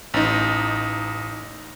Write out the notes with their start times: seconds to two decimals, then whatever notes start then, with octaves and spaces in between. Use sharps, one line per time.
0.14 A1 D#4